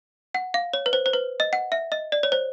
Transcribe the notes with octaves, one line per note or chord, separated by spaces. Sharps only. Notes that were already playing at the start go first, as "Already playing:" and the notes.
F#5
F5
C#5
B4
C5
C5
B4
D#5
F#5
E5
D#5
D5
C#5
C5